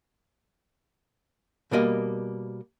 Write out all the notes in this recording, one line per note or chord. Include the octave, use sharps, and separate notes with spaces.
B2 G3 A#3 D#5